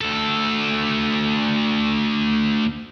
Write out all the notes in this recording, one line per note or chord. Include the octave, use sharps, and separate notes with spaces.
D2 A4